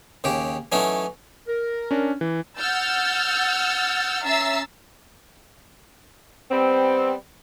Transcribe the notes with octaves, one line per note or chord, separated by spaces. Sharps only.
D#2 C#3 G4
E3 F#3 A3 C#4 D#4
A#4
C#4 D4
E3
F#5 E6 F6 G6 A6
C#4 E5 A#5 E6 A6 C7
G3 B3 C4